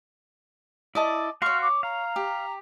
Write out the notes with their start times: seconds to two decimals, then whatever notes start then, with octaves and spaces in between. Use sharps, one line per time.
0.95 E4 D5 D#5 A5
1.42 F#4 C#5 F5 C6 C#6 F6
1.61 D6
1.83 F5 A#5
2.16 G4